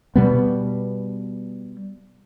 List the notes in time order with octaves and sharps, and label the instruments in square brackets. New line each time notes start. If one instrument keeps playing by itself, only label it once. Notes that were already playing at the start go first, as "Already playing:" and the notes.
[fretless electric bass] B2 G3 B3